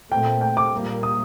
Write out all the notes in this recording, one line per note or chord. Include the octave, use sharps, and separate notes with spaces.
A#2 A3 C4 G5
G5
D6
A#2 G3 A#3
D#6